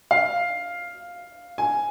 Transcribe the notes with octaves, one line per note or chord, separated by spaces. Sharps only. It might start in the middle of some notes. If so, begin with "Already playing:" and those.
F5
G#5